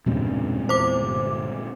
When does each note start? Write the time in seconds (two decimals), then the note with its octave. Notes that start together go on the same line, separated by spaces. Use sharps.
0.06 E1 G2 A#2 C#3 G#3 C4
0.69 E2 C5 D6
1.00 G1 C3